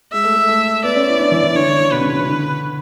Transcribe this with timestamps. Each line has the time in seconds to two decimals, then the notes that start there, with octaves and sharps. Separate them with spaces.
0.12 G#3 E5
0.24 A3
0.36 A3
0.48 A3
0.84 B3 D5
0.96 C#4
1.08 E4
1.20 D4
1.32 E3
1.44 E3
1.55 D3 C#5
1.67 D3
1.79 D3
1.91 B2 B4
2.01 C#3
2.09 D3
2.18 E3
2.27 D3